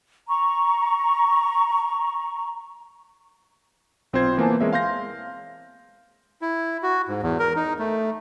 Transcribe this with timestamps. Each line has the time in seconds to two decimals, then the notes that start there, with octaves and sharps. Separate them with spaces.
0.28 A#5 C#6
4.13 B1 C4 F4 C5 G#6
4.38 E3 A#3 B3 C5 G#5 A5
4.61 G#3 C4 A#4 C#5 E5
4.73 F5 C6 G6 A#6
6.42 E4
6.83 F#4
7.08 G#2
7.23 E2
7.39 A#4
7.56 D#4
7.79 A3